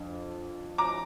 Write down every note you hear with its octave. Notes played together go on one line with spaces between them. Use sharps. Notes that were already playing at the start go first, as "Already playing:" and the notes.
Already playing: F2 D4
A#5 D6